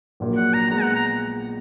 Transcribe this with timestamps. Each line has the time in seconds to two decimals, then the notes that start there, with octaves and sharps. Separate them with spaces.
0.20 A#1 A#2 F#3 A#3
0.37 F#5
0.54 A#5
0.71 A#2 G#3 B3 A#5
0.82 F#5
0.95 A#5